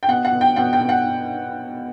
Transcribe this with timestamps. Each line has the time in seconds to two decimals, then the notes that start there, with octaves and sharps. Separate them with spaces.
0.03 G5
0.08 B2 F#5
0.25 F#5
0.32 B2
0.41 G5
0.56 B2 F#5
0.73 G5
0.81 B2
0.89 F#5